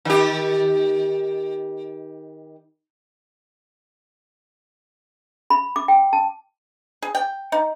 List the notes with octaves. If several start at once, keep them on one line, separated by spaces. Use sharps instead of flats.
D#3 G4
B5
D6
G5
A5
G#4
G5
D#4